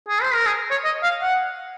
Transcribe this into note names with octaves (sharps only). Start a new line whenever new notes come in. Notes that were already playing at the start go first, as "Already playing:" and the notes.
G#4
C5
A#4
G#4
C#5
D#5
F5
F#5